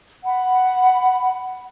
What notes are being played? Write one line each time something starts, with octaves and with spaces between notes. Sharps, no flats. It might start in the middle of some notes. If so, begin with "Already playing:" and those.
F#5 B5